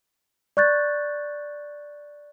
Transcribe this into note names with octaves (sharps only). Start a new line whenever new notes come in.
D5 C#6 F#6 G6 A6